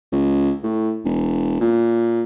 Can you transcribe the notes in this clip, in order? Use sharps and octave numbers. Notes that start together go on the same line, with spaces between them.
C#2
A2
E1
A#2